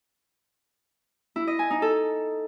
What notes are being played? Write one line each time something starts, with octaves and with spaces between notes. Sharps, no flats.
E4
D#5
G#5
D#4
A4